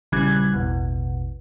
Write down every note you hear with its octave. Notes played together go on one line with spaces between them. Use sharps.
A#1 C#3 E3 G3 F#6 G#6
A1 E2 B2